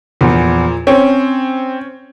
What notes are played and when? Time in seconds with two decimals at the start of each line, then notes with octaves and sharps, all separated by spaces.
0.21 E2 A#2 F3
0.87 C4 C#4 C#5